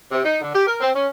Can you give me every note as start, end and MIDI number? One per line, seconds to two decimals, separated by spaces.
0.11 0.22 48
0.25 0.41 63
0.41 0.52 50
0.53 0.64 67
0.67 0.75 70
0.81 0.91 60
0.95 1.07 61